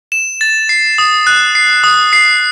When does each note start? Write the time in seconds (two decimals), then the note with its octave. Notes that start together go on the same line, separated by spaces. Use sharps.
0.12 E7
0.41 A6
0.69 C7
0.98 D#6
1.27 F#6
1.55 C7
1.84 D#6
2.13 C7